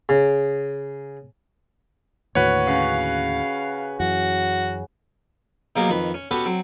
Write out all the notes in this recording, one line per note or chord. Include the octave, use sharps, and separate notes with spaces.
C#3
D#2 A2 D3 F#4 B4 C#5
C#3 F5
F#2 E3 F#4
B2 F#3 A#3 G4 G#4 A#4
F2 D#3 B4
C#4
B3 C#4 F#4 G4 A4 B4
F#3 C4